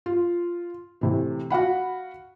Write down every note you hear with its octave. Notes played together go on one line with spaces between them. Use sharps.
F4
A2 C3 E3
F#4 F5 F#5 B5